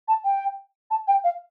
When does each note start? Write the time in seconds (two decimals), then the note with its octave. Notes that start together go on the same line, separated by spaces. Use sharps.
0.08 A5
0.25 G5
0.91 A5
1.08 G5
1.24 F5